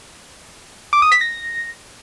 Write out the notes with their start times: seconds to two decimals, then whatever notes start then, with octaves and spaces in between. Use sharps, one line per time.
0.93 D6
1.02 D#6
1.12 B6
1.21 A#6